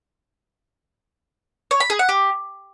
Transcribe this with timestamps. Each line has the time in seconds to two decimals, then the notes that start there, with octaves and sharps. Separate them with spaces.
1.71 C#5
1.80 B5
1.90 G#4
1.99 F#5
2.09 G4